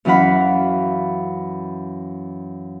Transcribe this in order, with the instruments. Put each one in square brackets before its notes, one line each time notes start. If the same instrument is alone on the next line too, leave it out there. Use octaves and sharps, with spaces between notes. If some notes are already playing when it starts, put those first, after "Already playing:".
[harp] F#2 E3 C#4 F5 F#5 B5